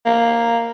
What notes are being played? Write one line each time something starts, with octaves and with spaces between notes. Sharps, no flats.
A#3